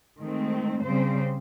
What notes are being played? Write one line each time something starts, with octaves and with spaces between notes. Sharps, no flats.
D#3 G#3 A3 C4
C#3 G3 C4 C5